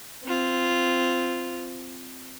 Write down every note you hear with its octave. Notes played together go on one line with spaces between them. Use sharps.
C4 F4